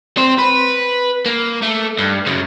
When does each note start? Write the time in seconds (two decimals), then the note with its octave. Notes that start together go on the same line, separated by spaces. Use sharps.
0.17 C4 C5
0.38 B4
1.26 A#3
1.62 A3
1.99 G2
2.26 F#2 C#3